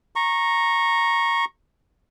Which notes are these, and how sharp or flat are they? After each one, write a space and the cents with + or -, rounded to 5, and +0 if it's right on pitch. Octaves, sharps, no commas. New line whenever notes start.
A#5 +0 C#6 -20